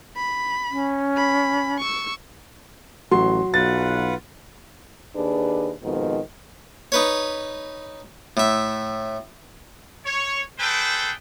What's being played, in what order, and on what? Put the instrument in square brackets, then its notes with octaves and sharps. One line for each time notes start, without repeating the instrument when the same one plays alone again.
[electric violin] B5
[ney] C#4
[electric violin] B5
C#6 E6
[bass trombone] A1 [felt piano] F#3 [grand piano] C6
[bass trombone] B1 [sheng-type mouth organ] F4 B4 F#5 [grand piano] A6
[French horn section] D#2 D4 G#4 B4
F2 G#2 B2 D#3
[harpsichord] D#4 B4 C#5
A2 E5
[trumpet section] C#5
G#4 A4 B4 C5 G5